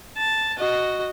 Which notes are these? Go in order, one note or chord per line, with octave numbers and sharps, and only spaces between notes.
A5
F#4 D#5